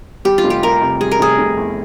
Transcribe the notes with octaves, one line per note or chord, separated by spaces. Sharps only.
G3 G4
F4
F1
G4
C3 A#4
C3
G3 G#4
A#4
F1 G#4
F1
E2